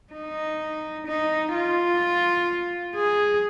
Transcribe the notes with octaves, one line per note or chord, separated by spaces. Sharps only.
D#4
D#4
F4
G#4